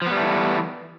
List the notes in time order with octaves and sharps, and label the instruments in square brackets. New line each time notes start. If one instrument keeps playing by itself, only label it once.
[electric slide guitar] F3
B3
G3
A3
E3